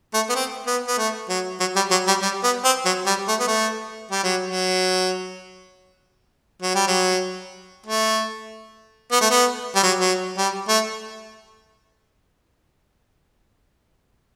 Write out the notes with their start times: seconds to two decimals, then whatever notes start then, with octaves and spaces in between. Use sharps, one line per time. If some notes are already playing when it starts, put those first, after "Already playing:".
0.14 A3
0.30 B3
0.35 C4
0.67 B3
0.88 B3
0.98 A3
1.29 F#3
1.60 F#3
1.76 G3
1.91 F#3
2.08 G3
2.22 G3
2.44 B3
2.65 C4
2.85 F#3
3.07 G3
3.28 A3
3.40 B3
3.48 A3
4.12 G3
4.23 F#3
4.46 F#3
6.62 F#3
6.75 G3
6.87 F#3
7.87 A3
9.12 B3
9.21 A3
9.31 B3
9.75 G3
9.83 F#3
10.01 F#3
10.37 G3
10.69 A3